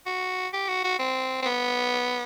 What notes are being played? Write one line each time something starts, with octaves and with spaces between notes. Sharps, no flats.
F#4
G4
F#4
F#4
C4
C4
B3